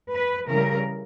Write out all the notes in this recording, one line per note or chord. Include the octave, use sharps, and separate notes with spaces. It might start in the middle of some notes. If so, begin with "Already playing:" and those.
B4
C#3 E3 G3 A#4